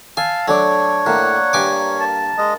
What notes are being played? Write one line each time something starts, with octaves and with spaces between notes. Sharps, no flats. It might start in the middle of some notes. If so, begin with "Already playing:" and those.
F5 G#5 A5 E6
F#3 A3 D4 C#5 D6
A2 A#3 F#5
G2 G#5 D6
A5
G#3 D#5